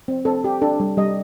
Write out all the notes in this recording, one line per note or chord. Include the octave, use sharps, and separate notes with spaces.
C4
C4 A4
G4
D4 A4
G3
G3 D#5